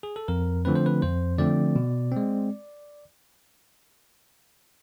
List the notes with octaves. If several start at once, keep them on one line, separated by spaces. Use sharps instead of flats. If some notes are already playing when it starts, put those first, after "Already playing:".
G#4
A4
F2 A#4
D3 F3 A3 C4 B4
C5
B4
F2 C5
D3 F3 A3 C4 D5
B2
C4
G#3